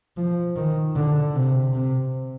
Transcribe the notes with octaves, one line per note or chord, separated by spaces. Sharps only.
F3
D#3
D3
C3
C3